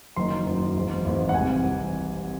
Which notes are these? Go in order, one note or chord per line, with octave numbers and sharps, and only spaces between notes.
F#1 F#2 D#3 C6
F#1 F#2 D#3
G#1 G#2 E3
G#1 G#2 E3
F#5
C2 C3 E3 G#5
C2 C3 E3